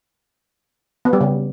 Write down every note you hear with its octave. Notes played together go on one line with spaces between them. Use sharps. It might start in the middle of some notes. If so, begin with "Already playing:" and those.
B3
G3
C#3